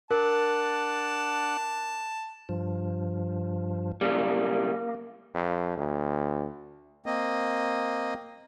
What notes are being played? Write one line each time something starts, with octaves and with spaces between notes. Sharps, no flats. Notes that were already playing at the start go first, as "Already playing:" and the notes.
D4 A#4 F#5 A5
G2 F3
B1 C#3 G3 A#3
F2
D2
A#3 C4 D#5